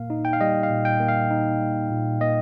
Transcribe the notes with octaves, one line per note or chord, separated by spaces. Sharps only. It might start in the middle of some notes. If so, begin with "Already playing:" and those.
Already playing: A#2 A#3 F5
D#4
G5
F5
G3 D#5
F5
A#2
G5
A#3
F5
D#4
G3
A#2
A#3 D#5